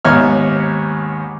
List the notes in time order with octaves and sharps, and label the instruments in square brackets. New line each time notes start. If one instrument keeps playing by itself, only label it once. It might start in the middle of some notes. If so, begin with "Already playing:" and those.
[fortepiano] D#2 G#2 B3 C#5 F6